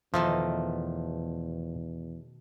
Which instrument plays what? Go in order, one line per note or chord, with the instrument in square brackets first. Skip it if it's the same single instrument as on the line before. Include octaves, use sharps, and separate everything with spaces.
[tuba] E2 [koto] B2 D#3 A3 [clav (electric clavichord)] F3